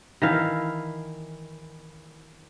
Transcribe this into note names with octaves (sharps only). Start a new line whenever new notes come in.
D#3 E3 F5